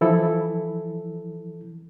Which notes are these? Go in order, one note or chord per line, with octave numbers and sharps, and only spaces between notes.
E3 F3 E4 A4